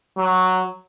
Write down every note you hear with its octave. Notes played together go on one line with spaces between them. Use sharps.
F#3